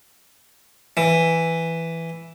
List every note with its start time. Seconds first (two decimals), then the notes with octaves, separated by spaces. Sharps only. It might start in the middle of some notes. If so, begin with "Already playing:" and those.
0.97 E3